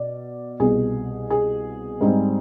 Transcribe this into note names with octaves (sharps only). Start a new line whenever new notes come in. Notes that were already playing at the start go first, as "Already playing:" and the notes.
Already playing: B2 D5
C2 B2 B3 G#4
G#4
G#2 G3 C4 D#4